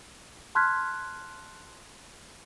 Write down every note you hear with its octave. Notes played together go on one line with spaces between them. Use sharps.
A5 C6 F6 F#6 G#6 B6